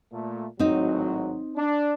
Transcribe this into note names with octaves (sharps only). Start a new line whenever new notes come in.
A#2 A3
G#1 A2 F#3 C4 D#4
D4